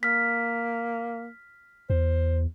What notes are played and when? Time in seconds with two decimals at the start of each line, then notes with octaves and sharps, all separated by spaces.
0.03 A#3 F6 B6
1.90 E2 C5